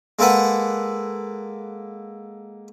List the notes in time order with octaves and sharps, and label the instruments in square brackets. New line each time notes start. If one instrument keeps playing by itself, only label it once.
[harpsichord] G#3 A#3 A4 B4 F#5